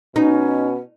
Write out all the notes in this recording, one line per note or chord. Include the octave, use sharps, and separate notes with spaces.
B2 C#4 D#4